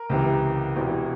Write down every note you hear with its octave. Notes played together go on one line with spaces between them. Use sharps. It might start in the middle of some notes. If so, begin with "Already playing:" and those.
Already playing: A#4
C#2 C3 E3
E1 E2 C3 E3